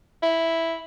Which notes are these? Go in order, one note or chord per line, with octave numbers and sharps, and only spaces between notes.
E4